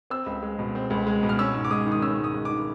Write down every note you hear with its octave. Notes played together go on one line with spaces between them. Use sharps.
C4 E6
C#2
G#3
B2
C4
C#2
G#3
B2
F6
C#4 E6
G#2
D6
G#3 D#6
D#3
D#6
C#4 E6
G#2
D#6
G#3
D6
D#3